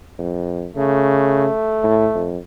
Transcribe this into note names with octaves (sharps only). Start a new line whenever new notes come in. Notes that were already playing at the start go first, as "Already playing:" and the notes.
F2
C#3 A3
A2
F2